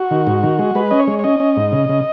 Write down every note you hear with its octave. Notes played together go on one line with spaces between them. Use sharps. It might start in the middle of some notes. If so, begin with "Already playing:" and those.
Already playing: F#4
D#3
G#2
D#3
G#3
G#3 B4
C#4 D#5
C#5
G#3
C#5
C#4 D#5
C#4
G#2
C#3
C#3